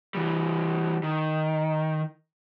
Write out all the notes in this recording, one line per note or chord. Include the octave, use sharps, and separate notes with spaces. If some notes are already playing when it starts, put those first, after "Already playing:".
E3 G3
D#3